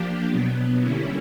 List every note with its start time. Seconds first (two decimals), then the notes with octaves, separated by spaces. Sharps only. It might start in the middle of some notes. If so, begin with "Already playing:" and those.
Already playing: F3 A#3 D4 G4
0.28 B2 F#3 B3
0.81 D3 G3 A#3 C#4 E4